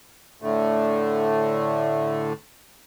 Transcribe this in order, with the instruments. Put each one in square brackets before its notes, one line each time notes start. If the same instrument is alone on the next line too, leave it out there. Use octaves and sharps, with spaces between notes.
[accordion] A2 D3 A3